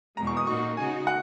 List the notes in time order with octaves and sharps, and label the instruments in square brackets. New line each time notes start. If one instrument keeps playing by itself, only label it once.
[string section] E2 B2 G#3 [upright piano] A#5
[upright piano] C#6
D#6
[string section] A#2 A#3 D#4 F#4 [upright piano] C#6
[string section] C#3 G#3 D#4 F#4 [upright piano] G#5
[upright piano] F#5